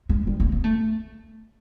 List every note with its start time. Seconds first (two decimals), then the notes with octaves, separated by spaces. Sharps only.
0.09 G#3
0.27 G3
0.40 A#3
0.52 B3
0.64 A3